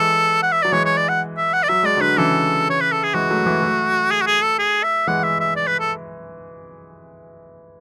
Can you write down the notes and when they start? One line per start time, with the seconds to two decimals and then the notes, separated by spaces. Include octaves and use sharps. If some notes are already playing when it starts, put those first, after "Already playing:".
Already playing: E3 G#3 A4
0.43 F#5
0.52 E5
0.63 F#3 D5
0.72 E3 G#3 C#5
0.85 C#5
0.97 D5
1.09 F#5
1.37 E5
1.53 F#5
1.63 D5
1.69 F#3 E5
1.83 G#3 D5
1.97 D3 F#3 B4
2.17 C#3 E3 A4
2.70 C#5
2.81 B4
2.92 A4
3.03 G#4
3.14 E3 G#3 F#4
3.30 F#3 A3
3.46 E3 G#3
3.63 F#3 A3
4.11 G#4
4.22 F#4
4.27 G#4
4.43 A4
4.59 G#4
4.83 E5
5.07 E3 G#3 F#5
5.23 E5
5.40 E5
5.56 D5
5.67 B4
5.80 A4